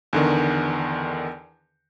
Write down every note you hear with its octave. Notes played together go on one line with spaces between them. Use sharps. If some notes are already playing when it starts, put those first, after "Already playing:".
E2 D3 D#3